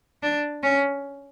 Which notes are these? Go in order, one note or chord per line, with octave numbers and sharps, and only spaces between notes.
D4
C#4